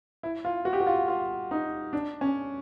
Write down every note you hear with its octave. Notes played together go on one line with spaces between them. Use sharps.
E4
F4
F#4
G4
F#4
F4
F4
D#4
D4
C#4